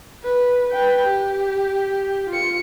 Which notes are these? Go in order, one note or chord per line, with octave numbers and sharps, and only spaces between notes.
B4
B4 G5
G4
F4 C#7